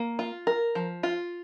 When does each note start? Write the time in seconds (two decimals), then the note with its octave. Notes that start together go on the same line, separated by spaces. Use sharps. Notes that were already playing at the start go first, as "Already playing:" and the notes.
Already playing: A#3
0.19 F4
0.47 A#4
0.75 F3
1.03 F4